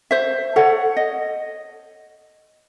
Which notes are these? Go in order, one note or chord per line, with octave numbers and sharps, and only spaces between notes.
C5 E5
A4 C#5 F#5
D#5